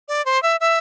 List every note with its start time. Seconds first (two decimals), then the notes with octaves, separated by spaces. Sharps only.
0.08 D5
0.26 C5
0.43 E5
0.60 E5